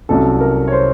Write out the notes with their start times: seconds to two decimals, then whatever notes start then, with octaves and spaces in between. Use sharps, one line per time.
0.09 C2 C3 F#3 A3 C#4 A4
0.41 A#4
0.67 C#5
0.72 C5